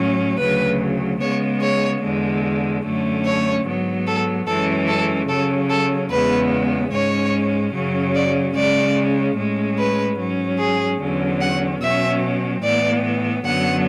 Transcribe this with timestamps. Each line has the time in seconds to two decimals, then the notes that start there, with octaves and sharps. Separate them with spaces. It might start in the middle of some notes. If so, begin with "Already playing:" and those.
Already playing: A2 F#3 C#4
0.39 D2 C#3 F#3 B4
1.20 C#3 G#3 B3 C#5
1.61 C#5
2.02 E2 D3 G#3
2.84 F#2 D3 A3 C#4
3.25 C#5
3.65 G#2 F#3 B3
4.06 A4
4.47 F#2 E3 G#3 C#4 A4
4.88 A4
5.28 C#3 F#3 C#4 A4
5.69 A4
6.10 E2 C#3 G#3 B3 B4
6.91 G#2 G#3 C#4 C#5
7.74 F#2 C#3 F#3 C#4
8.14 D5
8.55 C#3 G#3 C#4 D5
9.36 A2 G#3 C#4
9.77 B4
10.18 G#2 F#3 C#4
10.59 G#4
11.00 E2 D3 F#3 C#4
11.40 F#5
11.81 B2 F#3 C#4 E5
12.62 A2 E3 B3 D5
13.44 F#2 D3 F#3 B3 F#5